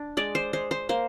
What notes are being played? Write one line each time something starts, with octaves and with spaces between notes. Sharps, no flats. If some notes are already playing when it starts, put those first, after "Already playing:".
Already playing: D4
G#3 D5
C5
G#3 C5
C5
A#3 C5